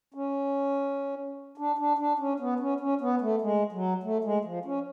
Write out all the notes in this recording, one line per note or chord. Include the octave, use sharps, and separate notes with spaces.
C#4
D4
D4
D4
C#4
B3
C#4
C#4
B3
A3
G#3
F#3
A3
G#3
F3
C#4